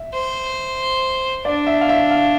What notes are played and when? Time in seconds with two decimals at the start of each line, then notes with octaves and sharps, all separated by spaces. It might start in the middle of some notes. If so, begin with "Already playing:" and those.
Already playing: E5
0.14 C5
1.45 D4 D5
1.67 E5
1.81 F5
1.89 E5
2.11 F5